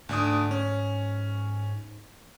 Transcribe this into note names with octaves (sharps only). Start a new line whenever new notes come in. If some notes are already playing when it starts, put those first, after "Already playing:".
D2 G#2 D4 D#6
C#4